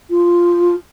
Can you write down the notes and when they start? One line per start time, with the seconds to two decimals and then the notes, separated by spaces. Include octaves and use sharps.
0.10 F4